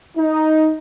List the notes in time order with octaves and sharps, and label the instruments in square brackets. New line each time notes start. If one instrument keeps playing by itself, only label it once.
[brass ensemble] D#4